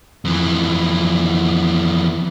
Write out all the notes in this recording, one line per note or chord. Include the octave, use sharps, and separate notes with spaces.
F2 E3